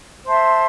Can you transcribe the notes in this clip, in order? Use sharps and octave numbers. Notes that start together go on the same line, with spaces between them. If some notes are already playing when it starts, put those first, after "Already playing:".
C5 E5 A5 C6